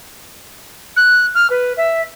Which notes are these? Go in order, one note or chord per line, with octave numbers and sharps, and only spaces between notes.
F#6
F6
B4
E5